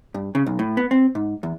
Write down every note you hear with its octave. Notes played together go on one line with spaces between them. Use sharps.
G2
C#3
B1
A2
B3
C4
G#2
E2